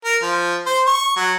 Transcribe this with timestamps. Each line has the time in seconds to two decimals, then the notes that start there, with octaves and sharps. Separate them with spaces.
0.05 A#4
0.22 F3
0.66 C5
0.87 C#6
1.17 F#3